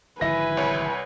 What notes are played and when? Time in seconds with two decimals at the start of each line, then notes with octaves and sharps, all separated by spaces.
0.21 G#1 D3 F3 E4 B4 G#5 A#6
0.57 C2 C#5